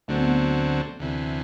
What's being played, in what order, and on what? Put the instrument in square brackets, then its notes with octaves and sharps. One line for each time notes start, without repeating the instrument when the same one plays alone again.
[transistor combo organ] D2 D3 F#3 C4 [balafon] A3
[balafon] B3
A3
[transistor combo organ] D2 C3 E3